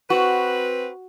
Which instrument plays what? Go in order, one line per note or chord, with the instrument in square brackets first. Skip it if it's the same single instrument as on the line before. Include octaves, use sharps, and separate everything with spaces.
[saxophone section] C4 B4 [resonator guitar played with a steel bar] F#4